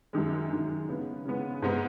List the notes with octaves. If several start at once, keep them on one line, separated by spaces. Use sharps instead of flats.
F#2 D#3 G#3
F#2 D#3 G#3
C#3 G#3 B3
C#3 G#3 B3
G#2 G#3 B3 D#4